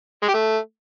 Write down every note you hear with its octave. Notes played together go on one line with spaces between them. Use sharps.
G#3
G4
A3